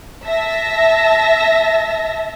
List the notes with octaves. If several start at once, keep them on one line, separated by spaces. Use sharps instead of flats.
E5 A5 A#6